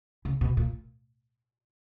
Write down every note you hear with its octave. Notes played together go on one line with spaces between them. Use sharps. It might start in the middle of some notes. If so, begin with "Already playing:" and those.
C#3
B2
A#2